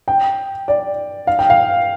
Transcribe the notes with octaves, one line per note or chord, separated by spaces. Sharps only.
G5
D5
F5
G5
F5